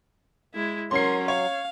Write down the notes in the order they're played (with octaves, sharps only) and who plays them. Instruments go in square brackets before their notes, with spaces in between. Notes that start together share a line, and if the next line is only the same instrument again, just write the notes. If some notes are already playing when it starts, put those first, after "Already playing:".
[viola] G#3 E4
[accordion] F#3 [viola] C#4 A#4 [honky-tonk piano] C6 C7
[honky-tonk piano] C#5 [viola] F5